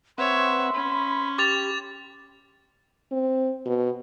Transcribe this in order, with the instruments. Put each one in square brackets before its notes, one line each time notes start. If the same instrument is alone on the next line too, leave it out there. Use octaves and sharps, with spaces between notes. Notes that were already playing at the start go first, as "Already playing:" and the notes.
[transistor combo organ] C4 B4 F#5 [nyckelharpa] C#5 E5 [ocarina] C6
[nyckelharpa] C#4 [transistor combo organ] B5
[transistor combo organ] G4 [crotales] D6 A6 F7
[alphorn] C4
B2